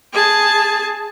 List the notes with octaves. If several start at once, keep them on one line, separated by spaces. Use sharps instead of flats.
G#4 A5